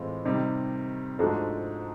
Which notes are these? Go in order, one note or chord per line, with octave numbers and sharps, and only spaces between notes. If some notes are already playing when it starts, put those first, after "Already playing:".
Already playing: A2 E3 G#3 C4 F4
C3 D#3 G3
G#2 F3 A3 D4 F#4